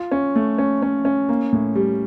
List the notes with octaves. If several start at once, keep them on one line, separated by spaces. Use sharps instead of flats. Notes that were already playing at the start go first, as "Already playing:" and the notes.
Already playing: F4
C#4
A3
C#4
C#4
C#4
A#3
A2
G3